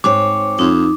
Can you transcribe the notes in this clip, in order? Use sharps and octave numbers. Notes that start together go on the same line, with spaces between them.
G#2 C4 C#5 D6
F2 D#4